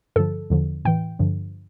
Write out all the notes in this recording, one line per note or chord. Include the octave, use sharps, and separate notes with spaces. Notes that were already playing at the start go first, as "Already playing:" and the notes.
G2 D3 F3 A4
E2 D3 F3
A2 E3 G5
G2 D3 F3